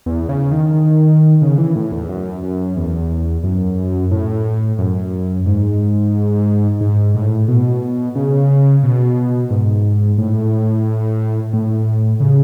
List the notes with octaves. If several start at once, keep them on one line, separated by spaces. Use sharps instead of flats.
E2
C#3
D#3
D#3
C#3
E3
A2
E2
F#2
F#2
E2
F#2
A2
F#2
G#2
G#2
A2
B2
C#3
B2
G#2
A2
A2
C#3